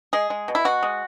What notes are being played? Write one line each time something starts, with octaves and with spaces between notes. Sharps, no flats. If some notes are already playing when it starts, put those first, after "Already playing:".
G#3 G#4
G#3
B2
E4
B2 F#4
G#3